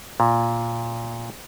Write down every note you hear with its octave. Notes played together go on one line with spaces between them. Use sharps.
A#2